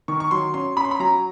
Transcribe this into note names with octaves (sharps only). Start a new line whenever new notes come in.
D#3 C#6
C#6
F#3 C6
C#4 C6
C#4 B5
C6
B5
F#3 A#5